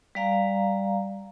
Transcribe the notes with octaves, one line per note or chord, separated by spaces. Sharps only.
G3 D5 F5 A#5